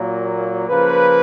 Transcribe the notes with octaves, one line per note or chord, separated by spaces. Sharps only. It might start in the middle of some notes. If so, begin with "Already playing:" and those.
Already playing: A#2 F#3 A#3
C#3 F3 A#3 B4